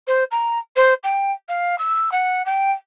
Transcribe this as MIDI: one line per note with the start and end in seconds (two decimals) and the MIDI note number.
0.07 0.24 72
0.31 0.58 82
0.76 0.93 72
1.03 1.31 79
1.48 1.78 77
1.78 2.09 88
2.11 2.42 78
2.45 2.71 79